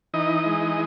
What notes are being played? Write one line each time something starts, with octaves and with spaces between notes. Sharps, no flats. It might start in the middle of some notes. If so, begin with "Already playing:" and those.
E3 D#4 D#5
G#3